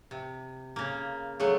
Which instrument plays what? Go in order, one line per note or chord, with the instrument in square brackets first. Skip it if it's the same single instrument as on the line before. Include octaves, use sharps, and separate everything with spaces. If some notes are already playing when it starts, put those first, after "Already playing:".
[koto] C3
C#3 A#3
[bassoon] C#3 [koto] F#3 A3 B3